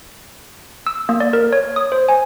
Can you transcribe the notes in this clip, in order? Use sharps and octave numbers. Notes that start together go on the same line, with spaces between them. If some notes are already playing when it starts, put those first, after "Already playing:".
E6
A#3
D5
A#4
C#5
D#6
C5
G#5